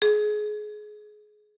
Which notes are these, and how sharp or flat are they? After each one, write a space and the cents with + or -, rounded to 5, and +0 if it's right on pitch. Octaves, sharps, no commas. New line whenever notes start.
G#4 +25